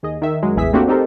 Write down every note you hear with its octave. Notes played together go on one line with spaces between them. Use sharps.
D#2 G#4 D#5
D#3 E5
F#2 F#3 G#3
A1 E2 E3 G#4 E5 B6
A3 A#3 C4 D4 F#4 G4
C4 D#4 G4 A4 A#4 C5